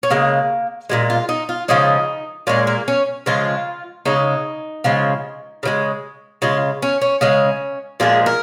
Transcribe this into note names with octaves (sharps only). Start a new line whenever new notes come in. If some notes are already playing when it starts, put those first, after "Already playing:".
C#4
C#3 G#3 A#3
A#2 F3 G#3
F4
D#4
F4
C#3 F3 G#3 D#4
A#2 G#3 C#4
A#3
C#4
C#3 F3 G#3 F4
C#3 G#3 D#4
C#3 F3 G#3
C#3 F3 G#3
C#3 G#3 F4
C#4
C#4
C#3 G#3 C#4
A#2 F3 G#3 G#4
A#4